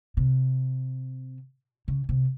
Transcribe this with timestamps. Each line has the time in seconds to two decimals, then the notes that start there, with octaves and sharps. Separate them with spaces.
0.17 C3
1.88 C#3
2.09 C3